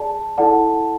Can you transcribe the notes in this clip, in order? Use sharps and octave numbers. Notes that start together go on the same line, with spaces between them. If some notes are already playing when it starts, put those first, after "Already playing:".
Already playing: G#4 D5 A5
E4 A4 D5 F#5 A5